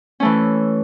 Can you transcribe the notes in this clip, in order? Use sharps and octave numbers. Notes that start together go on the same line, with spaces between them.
E3 A3 C#4